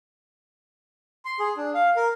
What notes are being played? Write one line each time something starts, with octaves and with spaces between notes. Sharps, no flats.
C6
G#4
D4
F5
A#4